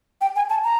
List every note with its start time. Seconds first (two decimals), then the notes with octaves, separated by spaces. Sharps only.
0.21 G5
0.36 G#5
0.50 A5
0.64 A#5